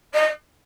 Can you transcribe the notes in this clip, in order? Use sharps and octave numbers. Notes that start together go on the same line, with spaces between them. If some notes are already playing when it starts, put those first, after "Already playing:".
D#5